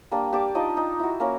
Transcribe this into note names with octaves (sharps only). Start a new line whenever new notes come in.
G3 A#3 D4
G4 D5 A5 D6
D4 D#4 F4 D#5
D#4
E4 F#4
A#3 C#4 A#4